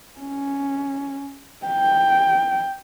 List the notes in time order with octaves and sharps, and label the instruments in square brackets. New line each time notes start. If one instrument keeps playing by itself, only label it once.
[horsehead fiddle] C#4
G5